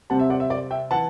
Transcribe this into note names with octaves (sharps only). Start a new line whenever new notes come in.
C3 G3 C4 F#5 A5
E5
D5 F#5
E5
D5
E5 G5
E3 F#5 A5